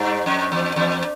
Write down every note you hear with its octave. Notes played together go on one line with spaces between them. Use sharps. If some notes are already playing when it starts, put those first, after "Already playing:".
Already playing: G2
F2
E2
E2